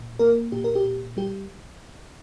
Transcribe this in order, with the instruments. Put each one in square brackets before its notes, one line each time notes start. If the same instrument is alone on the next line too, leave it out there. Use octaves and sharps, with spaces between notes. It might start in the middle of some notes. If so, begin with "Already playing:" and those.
Already playing: [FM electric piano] A#2
A#3 A#4
A#2 G4
A#4
G4
A#2
G3 G4